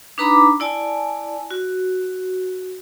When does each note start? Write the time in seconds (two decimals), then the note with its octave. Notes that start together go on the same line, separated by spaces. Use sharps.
0.18 D4 D#4 B4 A#5 B5 D6
0.60 E4 D5 G#5 A5
1.51 F#4